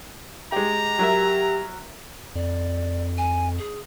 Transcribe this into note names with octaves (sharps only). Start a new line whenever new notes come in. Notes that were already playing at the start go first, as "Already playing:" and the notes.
G#3 G4 A#5
F#3 G4 A#4 E5
F2 D5
G#5
G#4